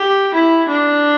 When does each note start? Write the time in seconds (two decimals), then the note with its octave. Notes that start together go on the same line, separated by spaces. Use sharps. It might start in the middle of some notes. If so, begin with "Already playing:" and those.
Already playing: G4
0.34 E4
0.68 D4